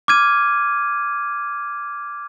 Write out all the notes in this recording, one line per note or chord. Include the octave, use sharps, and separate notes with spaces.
D6 F6 G#6 D#7